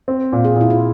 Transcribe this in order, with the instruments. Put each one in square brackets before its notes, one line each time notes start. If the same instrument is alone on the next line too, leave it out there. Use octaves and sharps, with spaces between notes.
[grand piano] C4
A#2
[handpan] G#4
[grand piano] A#2 [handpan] E4
[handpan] F4